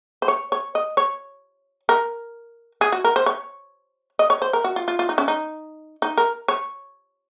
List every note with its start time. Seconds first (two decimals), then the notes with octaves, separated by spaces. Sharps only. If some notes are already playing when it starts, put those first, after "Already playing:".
0.22 C5
0.28 C#5
0.52 C#5
0.75 D#5
0.97 C#5
1.89 A#4
2.81 G#4
2.92 F#4
3.05 A#4
3.16 C5
3.26 C#5
4.19 D#5
4.30 C#5
4.42 C5
4.53 A#4
4.64 F#4
4.76 F4
4.88 F4
4.99 F4
5.09 D#4
5.18 C#4
5.28 D#4
6.02 D#4
6.18 A#4
6.48 C#5